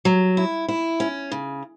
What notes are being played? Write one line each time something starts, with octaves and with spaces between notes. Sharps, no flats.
F#3
E4
E4
C#4
C#3